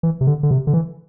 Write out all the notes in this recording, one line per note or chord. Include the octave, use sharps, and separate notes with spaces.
E3
C3
D3
D3
C3
D3
E3